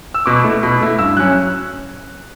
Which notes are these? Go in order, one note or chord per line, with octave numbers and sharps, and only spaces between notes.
E6
B2 D6
A3 E4
B2
A3 E4
G2 E6
F#3 C#4 F#6